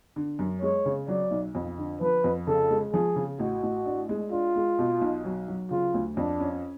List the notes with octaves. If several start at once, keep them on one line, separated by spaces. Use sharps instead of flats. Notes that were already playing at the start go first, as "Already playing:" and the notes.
D3
F#2
G#3 C#5
C#3
F#3 D5
B1
F2
D3
F3 B4
F2
C#3 A4
G#3
F3 G#4
C#3
A1 F#4
A1
D4
G#3
D4 F4
G#3
B2
B1
F#3
F#3
C#3 F4
D2
F2 D4
C#4